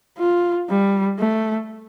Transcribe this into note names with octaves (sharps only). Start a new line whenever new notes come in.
F4
G3
A3